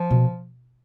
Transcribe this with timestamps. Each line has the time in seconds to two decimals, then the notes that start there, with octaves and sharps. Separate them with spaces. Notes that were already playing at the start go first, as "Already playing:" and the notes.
Already playing: F3
0.10 B2